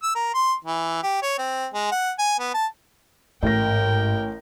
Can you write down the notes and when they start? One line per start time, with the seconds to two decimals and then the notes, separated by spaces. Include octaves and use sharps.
0.03 E6
0.15 A#4
0.34 C6
0.64 E3
1.03 G4
1.22 C#5
1.38 C4
1.74 G#3
1.92 F#5
2.19 G#5
2.39 B3
2.54 A5
3.43 A1 G#2 A#4 G5 A#6